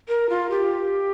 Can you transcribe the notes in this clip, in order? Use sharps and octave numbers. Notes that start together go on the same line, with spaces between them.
A#4
F4
G4